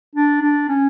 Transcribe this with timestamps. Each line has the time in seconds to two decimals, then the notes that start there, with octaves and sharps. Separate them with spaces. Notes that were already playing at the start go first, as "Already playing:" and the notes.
0.15 D4
0.42 D4
0.69 C#4